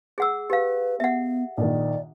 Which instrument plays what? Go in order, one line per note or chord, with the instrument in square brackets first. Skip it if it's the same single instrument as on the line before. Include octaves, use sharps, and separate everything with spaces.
[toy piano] G#4 F#5 E6
[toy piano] G4 F5 [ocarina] B4
[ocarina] B3 [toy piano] E5 F#5
[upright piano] A#1 D#3 [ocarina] D5